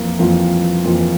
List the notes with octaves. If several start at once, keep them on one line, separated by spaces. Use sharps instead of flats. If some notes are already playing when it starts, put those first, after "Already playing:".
Already playing: F2 E3 A#3 F4
F2 E3 A#3 F4
F2 E3 A#3 F4